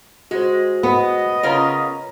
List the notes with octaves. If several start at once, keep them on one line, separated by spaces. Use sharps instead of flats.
G#3 F#4 C5
B3 D#5
C#3 F4 A#4 C#5 A#5